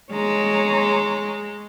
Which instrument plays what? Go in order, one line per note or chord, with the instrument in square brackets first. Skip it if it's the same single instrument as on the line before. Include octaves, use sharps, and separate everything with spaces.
[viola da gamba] G#3 [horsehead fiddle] C#5 A#5